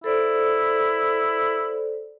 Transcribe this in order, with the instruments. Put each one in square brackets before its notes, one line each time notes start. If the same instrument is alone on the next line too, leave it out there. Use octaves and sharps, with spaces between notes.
[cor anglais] E4 [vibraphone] A4 C5 D5